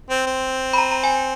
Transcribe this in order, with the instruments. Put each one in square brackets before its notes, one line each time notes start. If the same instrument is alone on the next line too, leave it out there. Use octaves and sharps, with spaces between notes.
[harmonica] C4
C4
[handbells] B5
A#5
A#5
G#5